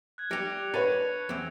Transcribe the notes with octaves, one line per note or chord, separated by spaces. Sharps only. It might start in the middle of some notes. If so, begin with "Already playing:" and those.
F#6 G#6
G3 G4 A#6 C#7 F7
D4 B4 C#5 C#7
E2 C4